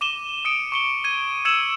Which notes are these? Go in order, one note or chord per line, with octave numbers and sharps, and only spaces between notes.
D6 D#7 E7 G7
D#6 C#7 D7
C#6 C#7 G7
G#6 D#7
E6 G#6 C#7 E7 F#7